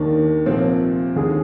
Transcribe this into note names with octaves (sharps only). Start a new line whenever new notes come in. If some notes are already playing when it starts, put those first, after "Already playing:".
Already playing: D#2 D#3 A#3 D4
C2 A#2 F3 C4
D#2 D3 G#3 D#4 G#4